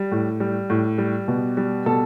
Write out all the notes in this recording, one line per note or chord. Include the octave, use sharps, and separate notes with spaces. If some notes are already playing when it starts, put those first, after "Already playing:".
Already playing: G3
A2
G3
A2
G3
B2
G3
B2 A4